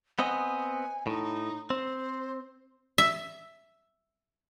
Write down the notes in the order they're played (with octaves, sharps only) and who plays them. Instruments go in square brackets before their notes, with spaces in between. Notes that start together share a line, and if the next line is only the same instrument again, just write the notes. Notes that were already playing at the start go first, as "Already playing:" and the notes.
[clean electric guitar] B3 C4 D#5 [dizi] G#5
[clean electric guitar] A2 [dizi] D#4
[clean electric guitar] C4 [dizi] C5
[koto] E5